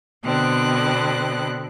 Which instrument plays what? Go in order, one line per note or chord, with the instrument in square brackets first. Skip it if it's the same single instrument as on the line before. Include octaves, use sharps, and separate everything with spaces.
[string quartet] B2 D3 B3 C4 F#6